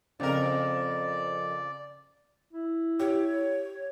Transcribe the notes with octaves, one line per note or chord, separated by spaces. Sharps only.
F2 C#3 C4 A#4 D5
E4
G4 C#5